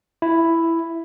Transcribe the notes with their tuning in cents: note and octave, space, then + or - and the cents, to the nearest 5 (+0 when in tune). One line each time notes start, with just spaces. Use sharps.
E4 +5